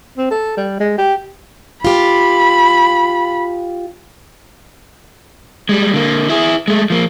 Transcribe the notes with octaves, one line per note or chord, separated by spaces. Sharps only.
C4
A4
G3
G#3
G4
F4 G4 B5
G3 G#3
D3 A#3
E4 G#4
G#3 A3
F3 A#3